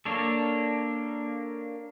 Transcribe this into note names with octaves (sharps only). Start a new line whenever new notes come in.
A#3 D4 A4 C#5